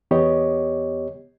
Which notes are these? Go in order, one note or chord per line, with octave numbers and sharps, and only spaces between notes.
E2 B3 G4 C#5 D#5